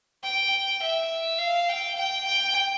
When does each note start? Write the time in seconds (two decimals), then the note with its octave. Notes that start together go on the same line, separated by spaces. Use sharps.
0.24 G5
0.82 E5
1.39 F5
1.69 G5
1.97 G5
2.26 G5